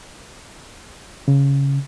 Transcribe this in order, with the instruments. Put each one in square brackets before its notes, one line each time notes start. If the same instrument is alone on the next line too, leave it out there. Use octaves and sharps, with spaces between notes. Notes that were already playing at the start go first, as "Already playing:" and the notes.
[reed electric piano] C#3